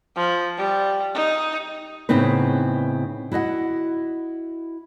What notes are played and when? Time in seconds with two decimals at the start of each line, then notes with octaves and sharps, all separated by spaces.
0.16 F3
0.58 G3
1.14 D#4
2.09 A2 C#3 B3 C4 D#4 B4
3.32 E4 F#4 D#5 F#5